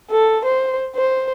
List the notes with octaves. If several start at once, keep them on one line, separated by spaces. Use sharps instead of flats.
A4
C5
C5